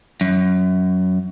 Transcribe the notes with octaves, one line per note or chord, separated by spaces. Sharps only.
F#2